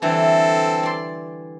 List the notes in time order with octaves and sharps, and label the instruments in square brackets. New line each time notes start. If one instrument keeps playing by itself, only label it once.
[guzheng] D3 E3 G3 [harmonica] C4 A4
[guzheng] D5 C6